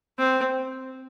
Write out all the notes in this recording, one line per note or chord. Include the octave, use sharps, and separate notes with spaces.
C4